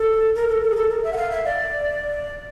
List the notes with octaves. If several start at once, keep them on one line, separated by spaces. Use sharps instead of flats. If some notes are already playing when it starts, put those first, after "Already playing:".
Already playing: A4
A#4
A4
A4
G#4
A4
A#4
E5
F#5
F5
E5
D5